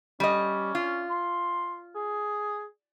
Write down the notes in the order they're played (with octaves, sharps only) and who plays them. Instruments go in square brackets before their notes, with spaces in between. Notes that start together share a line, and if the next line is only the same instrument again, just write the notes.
[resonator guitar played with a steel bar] G3 D#5 [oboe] C#4
[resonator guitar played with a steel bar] F4
[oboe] C6
G#4